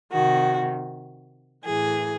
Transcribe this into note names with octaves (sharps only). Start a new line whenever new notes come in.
C3 D#3 F#4
A2 E3 G#4